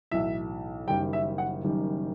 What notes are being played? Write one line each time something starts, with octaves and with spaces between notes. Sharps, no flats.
B1 A2 E3 E5
F#1 F#2 D#3 G3 G5
E5
F#5
F#1 F#2 D#3 G3